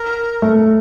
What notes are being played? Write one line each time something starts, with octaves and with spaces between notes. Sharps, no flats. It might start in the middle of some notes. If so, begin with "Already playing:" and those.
Already playing: A#4
A3